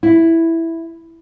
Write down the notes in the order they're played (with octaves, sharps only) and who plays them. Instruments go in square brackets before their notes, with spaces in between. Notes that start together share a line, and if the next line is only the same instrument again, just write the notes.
[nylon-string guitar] E4